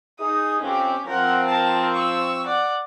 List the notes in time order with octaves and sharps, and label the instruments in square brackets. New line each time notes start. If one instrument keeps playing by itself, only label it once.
[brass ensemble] D#4 G#4 [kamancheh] D#6
[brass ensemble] F2 C4 [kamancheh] C#4 G4
[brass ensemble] F3 C4 [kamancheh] A#4 F#5
[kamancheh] A#4 A5
C#6 E6
D5 F#5